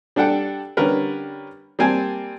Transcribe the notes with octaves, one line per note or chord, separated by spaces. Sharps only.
G3 D4 A4 F#5 G5
D3 G3 C#4 A#4 B4
G3 A#3 C4 G#5 A5